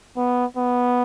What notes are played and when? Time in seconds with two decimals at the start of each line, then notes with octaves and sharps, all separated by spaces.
0.17 B3
0.57 B3